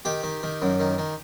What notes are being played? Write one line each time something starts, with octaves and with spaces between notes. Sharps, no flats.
D#3 G4
D#3
D#3
F#2
D#3
D#3